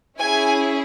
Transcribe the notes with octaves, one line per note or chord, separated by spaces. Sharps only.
C#4 E4 G#4 G#5